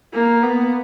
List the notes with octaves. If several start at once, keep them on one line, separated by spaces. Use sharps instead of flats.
A#3
B3